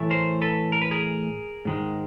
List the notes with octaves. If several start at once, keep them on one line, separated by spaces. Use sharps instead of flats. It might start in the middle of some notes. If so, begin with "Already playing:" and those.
Already playing: A2 E3 A3
A#4 C5
A4 B4
A#4
B4
G#4 A#4
G#2 D#3 G#3